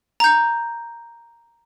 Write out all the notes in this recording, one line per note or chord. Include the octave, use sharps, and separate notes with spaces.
A#5 G6